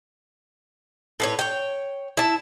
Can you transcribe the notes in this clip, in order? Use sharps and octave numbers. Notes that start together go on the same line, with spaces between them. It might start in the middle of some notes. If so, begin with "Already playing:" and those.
A2 B4 C#5
C#5 G5
E4 A5